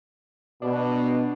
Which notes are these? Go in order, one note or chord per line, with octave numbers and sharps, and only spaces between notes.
B2 D4